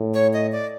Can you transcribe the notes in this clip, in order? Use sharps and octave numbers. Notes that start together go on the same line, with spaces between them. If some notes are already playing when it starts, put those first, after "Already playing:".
Already playing: A2
C#5
D#5
D5